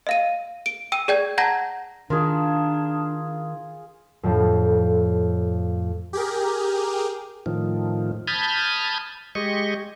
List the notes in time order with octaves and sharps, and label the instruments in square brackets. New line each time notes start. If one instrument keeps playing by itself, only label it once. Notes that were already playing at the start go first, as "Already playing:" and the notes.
[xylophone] D#5 F5 D#7
D7
G5 E6 D#7
G#4 D5 G5 G6 G#6
F#5 A5 A#5 G6 G#6 A#6
[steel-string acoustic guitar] D#3 [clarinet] D4 [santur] F4 G#4
[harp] F2 A2 F3
[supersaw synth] G4 G#4 A#4
[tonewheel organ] A2 D#3 F3
A5 B5 D#6 F6 G6 G#6
G#3 G4 D#5 C#6